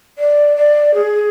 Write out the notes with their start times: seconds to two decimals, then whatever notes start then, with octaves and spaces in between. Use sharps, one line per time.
0.18 D5
0.56 D5
0.94 G#4